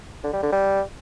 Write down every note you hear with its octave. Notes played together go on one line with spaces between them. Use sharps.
D3
G3
D3
G3